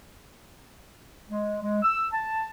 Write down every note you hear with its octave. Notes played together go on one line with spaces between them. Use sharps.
G#3
G#3
E6
A5